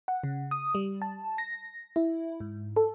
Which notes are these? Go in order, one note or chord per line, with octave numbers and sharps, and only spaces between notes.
F#5
C#3
D#6
G3
A5
A#6
E4
G#2
A4